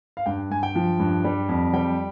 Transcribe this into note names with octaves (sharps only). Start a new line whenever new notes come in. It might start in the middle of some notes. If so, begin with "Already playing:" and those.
F5
G2 G5
G2 G#5
G5
F3
G2
G3
F2
G3 G5